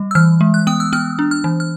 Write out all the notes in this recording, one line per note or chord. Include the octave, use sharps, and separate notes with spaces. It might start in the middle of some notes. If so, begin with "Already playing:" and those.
Already playing: G3
E6
E3 F6
G#3
F#6
B3 D#6
E6
B3 F6
D4
F6
E3
F6